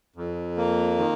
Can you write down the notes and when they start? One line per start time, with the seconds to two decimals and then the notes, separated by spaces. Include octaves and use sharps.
0.16 F2
0.57 A#3
0.98 D#3